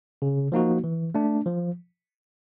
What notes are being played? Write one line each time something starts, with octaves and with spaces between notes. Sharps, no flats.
C#3
F3 A#3 D#4 F#4
E3
A3 D4
F3